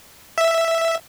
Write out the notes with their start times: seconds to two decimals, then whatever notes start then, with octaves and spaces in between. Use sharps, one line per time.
0.38 E5